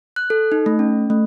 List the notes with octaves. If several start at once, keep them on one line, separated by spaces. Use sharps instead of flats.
F#6
A4
D#4
A3
C#4
A3